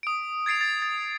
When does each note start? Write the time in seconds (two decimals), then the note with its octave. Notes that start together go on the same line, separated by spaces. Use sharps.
0.03 D#6 D7
0.46 G#6 A6 C7 D7 F7
0.61 A6
0.82 A6